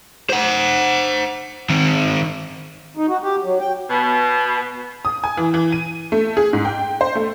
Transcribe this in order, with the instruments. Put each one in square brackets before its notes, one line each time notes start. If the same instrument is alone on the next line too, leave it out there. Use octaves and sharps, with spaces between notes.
[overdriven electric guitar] C5 F#5
D#3 C4
[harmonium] D#4
F#4
G4
F#3
G5
[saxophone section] B2
[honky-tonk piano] D#6
G#5
E3
E3
D#7
A3
G#4
G#2
G5
C5
A3